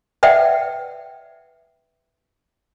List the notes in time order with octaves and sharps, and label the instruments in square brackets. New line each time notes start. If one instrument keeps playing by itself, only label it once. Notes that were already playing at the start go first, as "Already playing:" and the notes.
[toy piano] B4 D5 E5 F#5 G5